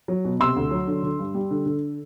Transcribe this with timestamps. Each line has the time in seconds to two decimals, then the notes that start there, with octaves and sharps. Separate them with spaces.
0.08 F#3
0.25 B2
0.40 C3 C6 E6
0.56 D2
0.71 F#3
0.87 D3
1.03 D3
1.19 G2
1.34 G3
1.51 D3
1.66 D3